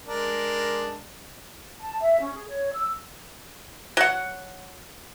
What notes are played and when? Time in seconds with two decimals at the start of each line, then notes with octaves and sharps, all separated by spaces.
0.05 G#3 D4 A#4
1.80 A5
2.00 E5
2.21 C#4
2.36 G#4
2.49 C#5
2.73 E6
3.97 F#3 F#5